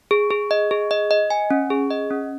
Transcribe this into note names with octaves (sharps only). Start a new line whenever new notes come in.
G#4
G#4
D#5
G#4
D#5
D#5
G#5
C#4
G#4
D#5
C#4